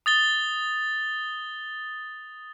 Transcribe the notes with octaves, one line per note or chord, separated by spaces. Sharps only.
D#6 A6 G7